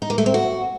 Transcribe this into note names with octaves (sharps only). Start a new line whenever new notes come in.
D#4
A#3
A3
C4
F#4